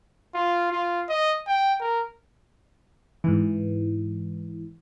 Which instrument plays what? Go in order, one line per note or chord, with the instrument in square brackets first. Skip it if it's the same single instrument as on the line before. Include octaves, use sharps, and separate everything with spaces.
[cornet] F4
F4
D#5
G5
A#4
[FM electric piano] G#2 E3